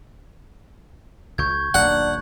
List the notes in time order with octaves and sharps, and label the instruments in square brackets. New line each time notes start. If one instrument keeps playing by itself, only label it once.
[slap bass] C#2 [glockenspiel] C#6 G6 G#6
[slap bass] D#1 B1 A#3 [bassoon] D4 [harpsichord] F#5